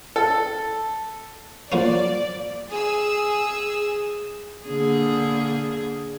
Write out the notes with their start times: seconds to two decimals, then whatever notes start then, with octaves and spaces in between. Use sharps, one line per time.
0.16 A4
1.72 F3 A#3 C#4 D5
2.72 G#4 E6
4.67 D3 A#3 G#4